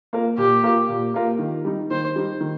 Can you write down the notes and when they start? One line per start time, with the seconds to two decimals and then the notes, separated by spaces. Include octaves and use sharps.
0.13 A#3 F4 A#4
0.37 A#2 G4
0.63 A#3 F4 A#4
0.89 A#2
1.14 A#3 F4 A#4
1.39 D#3
1.65 G3 D#4
1.91 D#3 C5
2.16 G3 D#4
2.41 D#3